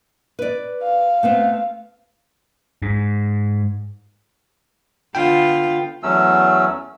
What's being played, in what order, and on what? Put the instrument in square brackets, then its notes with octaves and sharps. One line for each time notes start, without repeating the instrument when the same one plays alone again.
[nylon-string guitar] B4 D5
[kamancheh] F5
[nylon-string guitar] A3 B3 C4
[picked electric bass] G#2
[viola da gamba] D3 B3 F4 [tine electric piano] G5
[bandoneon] E2 F#3 A3 C#4 E6